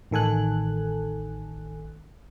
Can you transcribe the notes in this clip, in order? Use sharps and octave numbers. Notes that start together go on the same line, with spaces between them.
A1 D#3 A4 G#5 F#6